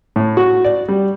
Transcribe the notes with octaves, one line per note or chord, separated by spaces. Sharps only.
A2
F#4
D5
G3